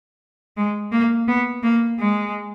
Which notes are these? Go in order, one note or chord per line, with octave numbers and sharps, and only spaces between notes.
G#3
A#3
B3
A#3
G#3